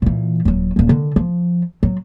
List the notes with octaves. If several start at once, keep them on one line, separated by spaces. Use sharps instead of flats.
A#2 E3
D#1 F#3
D#1 F2
D3 D#3
F3
F#3